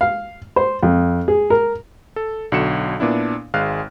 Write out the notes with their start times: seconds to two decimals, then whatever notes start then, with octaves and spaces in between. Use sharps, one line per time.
0.01 F5
0.56 C5
0.83 F2
1.28 G#4
1.50 A#4
2.16 A4
2.52 B1 D3 F#4 C#7 E7
3.00 A#2 B3 D4 E4
3.54 G#1 G#3 F5 F6 F#6